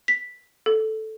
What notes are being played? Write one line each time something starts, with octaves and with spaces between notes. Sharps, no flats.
B6
A4